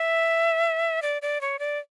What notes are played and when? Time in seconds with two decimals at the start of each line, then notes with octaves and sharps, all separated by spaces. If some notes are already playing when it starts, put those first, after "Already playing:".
Already playing: E5
1.02 D5
1.22 D5
1.41 C#5
1.59 D5